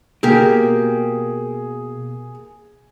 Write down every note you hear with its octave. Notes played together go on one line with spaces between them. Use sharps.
B2 A#3 G4 G#4 A#4